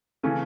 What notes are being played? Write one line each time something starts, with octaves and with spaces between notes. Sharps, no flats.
C#3 E3 A3 C#4